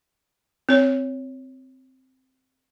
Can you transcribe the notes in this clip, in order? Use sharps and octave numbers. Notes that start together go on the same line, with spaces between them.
C4 C#5